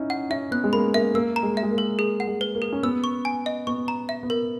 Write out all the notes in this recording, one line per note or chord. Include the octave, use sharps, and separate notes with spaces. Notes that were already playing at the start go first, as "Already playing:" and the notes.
Already playing: C#4 D#4 E4
F#5
C#4 E5
B3 F#6
G#3
A#3 B5
A#3 E5
A#3 E6
A#5
G#3
E5
G#3
A#3
A#4
G#4
F#5
G#3
B4
A#3
G#4
C#4
B3 E6
C#6
G#5
D#5
B3 C#6
A#5
E5
B3
A#4